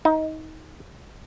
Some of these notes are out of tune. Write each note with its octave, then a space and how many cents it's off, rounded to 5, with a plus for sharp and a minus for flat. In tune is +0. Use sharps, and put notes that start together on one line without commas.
D#4 +20